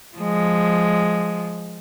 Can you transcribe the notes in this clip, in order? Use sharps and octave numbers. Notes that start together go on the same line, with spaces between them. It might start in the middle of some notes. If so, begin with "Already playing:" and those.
F3 G#3